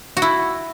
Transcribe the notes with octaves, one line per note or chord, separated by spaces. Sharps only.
F#4
E4